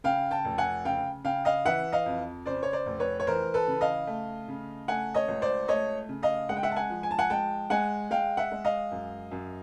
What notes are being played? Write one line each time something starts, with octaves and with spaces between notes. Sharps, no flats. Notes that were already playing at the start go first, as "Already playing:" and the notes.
C#3 F5 G5
G5 A5
F1
F#5 G#5
C#3 F5 G5
C#3 F5 G5
D#5 F5
E3 E5 F#5
D#5 F5
F2
C#3 C5 D5
C#5
C5 D5
F1
B4 C#5
C#5
E3 A#4 C5
A4 B4
C#3
D#5 F5
A3
C#3
A3 F#5 G#5
C#5 D#5
C#2
C5 D5
A3 C#5 D#5
C#3
D#5 F5
G#3 F#5
G5
E5 F#5
A5
F#5 G#5
F3
G#5
A5
F#5 G#5
G#3 G5 A5
G#3 F#5 G#5
G#3 F5 G5
E5 F#5
G#3
D#5 F5
F#2
F#2